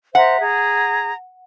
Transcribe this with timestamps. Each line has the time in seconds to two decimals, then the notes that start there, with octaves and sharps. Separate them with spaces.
0.15 C5 E5 F#5 A#5
0.40 G#4 A#5